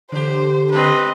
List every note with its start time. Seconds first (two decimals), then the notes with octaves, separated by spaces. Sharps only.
0.12 D3 E3 G4 C5
0.72 C#3 G3 C4 G#4 B4 D#5